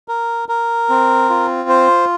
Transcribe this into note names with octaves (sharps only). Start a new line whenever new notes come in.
A#4
A#4
C4
F4
C5